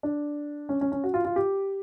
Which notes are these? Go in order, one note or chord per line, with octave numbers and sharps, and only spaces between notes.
D4
C#4
C#4
C#4
F#4
F4
F4
G4